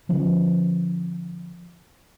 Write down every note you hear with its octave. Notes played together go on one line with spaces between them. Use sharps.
D3 F3 C#4